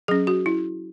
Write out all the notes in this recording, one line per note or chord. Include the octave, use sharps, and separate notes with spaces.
F#3 C#4 G#4
F#4
E4